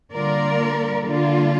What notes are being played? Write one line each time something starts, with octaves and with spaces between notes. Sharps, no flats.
D3 G3 A#3 F4 A#4 D5
D3 G3 A#3 D4 F4